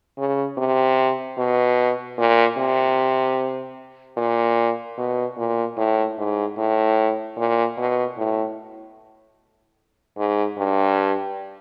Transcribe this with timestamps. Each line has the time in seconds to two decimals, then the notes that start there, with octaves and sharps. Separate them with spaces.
0.18 C#3
0.57 C3
1.37 B2
2.18 A#2
2.58 C3
4.17 A#2
4.97 B2
5.37 A#2
5.77 A2
6.17 G#2
6.58 A2
7.37 A#2
7.77 B2
8.17 A2
10.17 G#2
10.58 G2